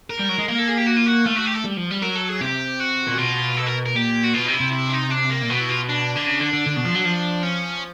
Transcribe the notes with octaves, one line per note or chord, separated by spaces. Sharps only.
A#4
G3
F#3
G#3
A#3 A#4
A4
G#4
G4
F#4
F4
F#4
A3 F4
F#4
G4
A4
G3
F3
G3
F#3 A#4
A4
G#4
C3 G4
F#4
A#2
B2 F4
A4
A#4
A#4
A#2 G4
F#4
B2 F4
C3 D#4
E4
C3
E4
D4
D#4
D4
A#3
A#2
B2 B3
E4
F4
D4
D3
C#3
D3
D3
D3
B2
F3
F#3
F3
C#4